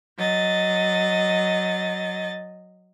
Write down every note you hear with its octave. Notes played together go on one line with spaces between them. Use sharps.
F#3 D#5 A6